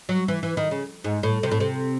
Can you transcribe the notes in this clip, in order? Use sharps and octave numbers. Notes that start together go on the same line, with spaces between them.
F#3
E3
E3
D#3
C#3
G#2
A2
C3
A2
C3